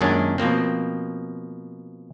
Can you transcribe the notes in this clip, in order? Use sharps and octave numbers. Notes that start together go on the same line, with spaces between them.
F#2 A#2 D#3 G#3 C#4 D4
B2 F3 A#3 C4